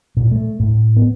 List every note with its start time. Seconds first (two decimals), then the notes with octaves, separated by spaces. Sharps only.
0.17 A#2
0.31 A3
0.60 A2
0.96 B3